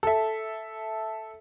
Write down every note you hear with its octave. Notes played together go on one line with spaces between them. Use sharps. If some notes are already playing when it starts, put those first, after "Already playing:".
A4 E5